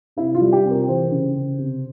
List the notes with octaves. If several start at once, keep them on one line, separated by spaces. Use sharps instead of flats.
C3 E4
F4
G3
G4
C3
A#4
E3 C5
C#3
C#3
C3